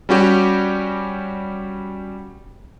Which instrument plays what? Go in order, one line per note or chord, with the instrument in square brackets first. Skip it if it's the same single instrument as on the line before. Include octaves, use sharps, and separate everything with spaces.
[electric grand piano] G3 C#4 F#4 G4